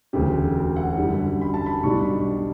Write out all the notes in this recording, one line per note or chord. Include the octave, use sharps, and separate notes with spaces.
E1 D2 C#3 F#3 G4
F#5
F#2 D3 G3
B5
A5
B5
B1 B2 G3 D4 C#6